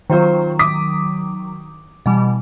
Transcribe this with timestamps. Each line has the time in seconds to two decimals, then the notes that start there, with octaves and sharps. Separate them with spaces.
0.10 D#3 F#3 C4 F4 C5
0.59 D6 D#6 B6
2.06 B2 E3 G3